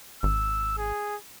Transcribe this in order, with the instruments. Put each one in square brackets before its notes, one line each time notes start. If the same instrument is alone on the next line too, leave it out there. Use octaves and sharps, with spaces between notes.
[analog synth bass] G#1 [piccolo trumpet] E6
[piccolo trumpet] G#4